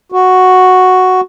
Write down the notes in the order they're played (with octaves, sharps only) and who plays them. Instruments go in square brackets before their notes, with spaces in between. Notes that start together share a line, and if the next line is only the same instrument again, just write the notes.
[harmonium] F#4